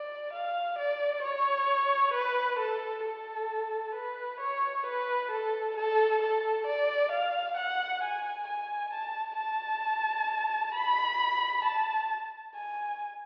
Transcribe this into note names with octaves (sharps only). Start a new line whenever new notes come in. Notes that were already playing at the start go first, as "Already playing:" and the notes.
Already playing: D5
F5
D5
C#5
B4
A4
A4
B4
C#5
B4
A4
A4
A4
D5
F5
F#5
G#5
G#5
A5
A5
B5
A5
G#5